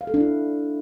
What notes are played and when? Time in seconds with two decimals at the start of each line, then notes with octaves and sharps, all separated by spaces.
0.01 F5
0.07 A4
0.14 D4
0.20 E4